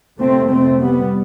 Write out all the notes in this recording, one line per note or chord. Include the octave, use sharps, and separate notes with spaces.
F2 C3 A3 C4
A3 C4
G3 B3